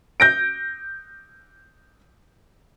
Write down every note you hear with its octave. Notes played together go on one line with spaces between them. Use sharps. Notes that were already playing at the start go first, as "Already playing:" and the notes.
G6 A#6 D7